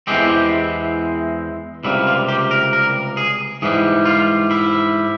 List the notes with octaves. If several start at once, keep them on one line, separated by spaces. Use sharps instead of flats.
E2 E3 G#3 C4 G4
C#2 C3 G3 A#3 E4
F4
G4
A#4
A#4
G#4
G#2 E3 G3 G#4
F4
E4